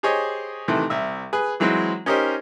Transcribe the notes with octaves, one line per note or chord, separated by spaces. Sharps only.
G4 G#4 C5 C#5 D#5
C3 D#3 E3 A3 A4
C2 E5
G#4 B4
E3 F#3 G#3 C4 E4
C#4 D#4 G4 A#4 C5